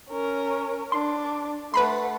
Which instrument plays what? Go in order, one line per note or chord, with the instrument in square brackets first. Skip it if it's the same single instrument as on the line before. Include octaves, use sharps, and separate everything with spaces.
[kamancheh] C#4 A#4
[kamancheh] D4 [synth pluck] C6
[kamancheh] A3 F#5 [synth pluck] B4 B5 C6